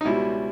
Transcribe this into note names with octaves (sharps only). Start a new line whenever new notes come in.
D#4
C#2 B2 G3 E4